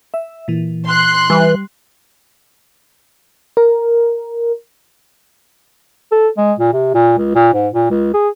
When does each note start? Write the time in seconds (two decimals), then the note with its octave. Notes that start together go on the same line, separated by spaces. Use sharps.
0.14 E5
0.48 A#2 E3
0.85 C6 F#6
1.30 E3 G3
3.57 A#4
6.12 A4
6.38 G#3
6.59 A#2
6.73 C3
6.95 A#2
7.18 C#2
7.35 A#2
7.54 G#2
7.74 A#2
7.90 C#2
8.14 G#4